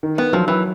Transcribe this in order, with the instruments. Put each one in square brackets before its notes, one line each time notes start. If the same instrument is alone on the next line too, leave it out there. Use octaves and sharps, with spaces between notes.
[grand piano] D#3
[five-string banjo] B3
[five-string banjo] F3 [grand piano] F#3
[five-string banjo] E3